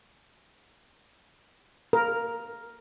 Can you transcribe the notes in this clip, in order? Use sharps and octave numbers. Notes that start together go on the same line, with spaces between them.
A#4